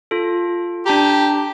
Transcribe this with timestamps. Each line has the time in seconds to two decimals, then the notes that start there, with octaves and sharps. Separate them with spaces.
0.11 F4 A4
0.86 D4 G4 A5 A#5